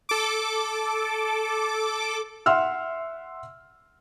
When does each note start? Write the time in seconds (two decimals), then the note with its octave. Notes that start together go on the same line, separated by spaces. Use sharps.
0.09 A4 D6
2.46 E5 F#5 C6 E6 F6